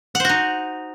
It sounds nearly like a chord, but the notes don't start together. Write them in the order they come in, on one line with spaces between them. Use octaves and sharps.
F#5 C5 F#4 D#4